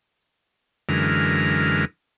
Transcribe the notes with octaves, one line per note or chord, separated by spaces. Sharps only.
F#2 D3 E3 G#3 A#4 F6